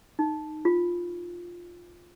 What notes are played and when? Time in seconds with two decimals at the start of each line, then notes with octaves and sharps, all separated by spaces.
0.19 D#4
0.65 F4